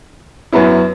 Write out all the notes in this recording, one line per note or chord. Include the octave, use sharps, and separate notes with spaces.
F#2 F#3 B3 E4